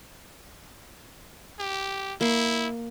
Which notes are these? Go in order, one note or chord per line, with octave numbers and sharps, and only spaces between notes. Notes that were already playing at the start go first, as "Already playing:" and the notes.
G4
A#3 E4